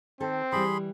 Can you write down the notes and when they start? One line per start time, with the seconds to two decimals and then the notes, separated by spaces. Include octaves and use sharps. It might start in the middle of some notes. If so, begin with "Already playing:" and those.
0.20 D#3 C4 A4
0.52 E3 G3 G#4 B5 C6